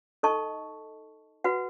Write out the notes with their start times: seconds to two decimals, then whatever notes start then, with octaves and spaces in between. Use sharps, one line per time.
0.23 D#4 A4 D#5 A5 C#6
1.44 F#4 B4 F#5